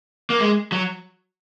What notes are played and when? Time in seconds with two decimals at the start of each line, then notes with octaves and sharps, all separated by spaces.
0.30 A#3
0.40 G#3
0.72 F#3